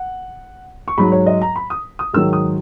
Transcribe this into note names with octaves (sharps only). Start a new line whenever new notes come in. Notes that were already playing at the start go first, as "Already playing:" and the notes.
Already playing: F#5
C#6
G#2 F#3 B5
C#5
D#5
A#5
B5
D#6
D#6
G#2 D#3 F#3 E6
D#6